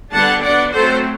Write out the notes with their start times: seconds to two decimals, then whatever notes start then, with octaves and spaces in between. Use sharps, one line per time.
0.13 D3 G3 B3 D4 F#5 A5
0.43 F#3 B3 D4 D5 F#5
0.73 F#3 A3 C4 A4 C5